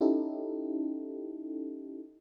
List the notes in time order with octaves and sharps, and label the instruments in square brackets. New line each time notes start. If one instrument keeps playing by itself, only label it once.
[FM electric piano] C#4 D#4 E4 G4 A4